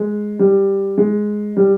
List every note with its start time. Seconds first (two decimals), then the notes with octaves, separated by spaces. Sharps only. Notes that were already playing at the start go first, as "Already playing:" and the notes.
Already playing: G#3
0.39 G3
0.98 G#3
1.57 G3